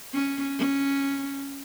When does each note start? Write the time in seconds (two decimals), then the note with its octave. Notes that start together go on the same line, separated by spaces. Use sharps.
0.13 C#4
0.58 C#4